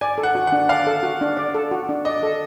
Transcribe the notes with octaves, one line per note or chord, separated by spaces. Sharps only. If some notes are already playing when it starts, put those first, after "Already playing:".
D5 G#5
A4
F#5
F#4
F#5
D4
D5 F5
A4
F#4
D4
D5
A4
F#4
D4
D5 D#5
A4